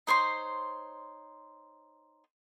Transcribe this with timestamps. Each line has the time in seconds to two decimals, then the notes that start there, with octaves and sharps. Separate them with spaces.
0.07 D#4 C5 C#5 C6